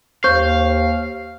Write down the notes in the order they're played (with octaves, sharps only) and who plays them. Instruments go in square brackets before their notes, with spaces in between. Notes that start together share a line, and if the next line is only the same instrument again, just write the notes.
[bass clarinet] D#2 [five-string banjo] C5 [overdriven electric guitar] F5 [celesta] C#6 G6